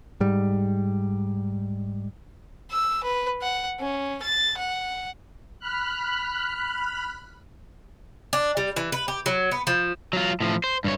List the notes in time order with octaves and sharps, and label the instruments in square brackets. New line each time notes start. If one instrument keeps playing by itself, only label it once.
[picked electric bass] G#2 G3
[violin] E6
B4
F#5
C#4
A6
F#5
[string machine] B5 F6 F#6
[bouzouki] D4
G3
E3
B4
G4
F#3
B3
F3
[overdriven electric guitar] F#3 F4
A2 F3
C5
G2 C#5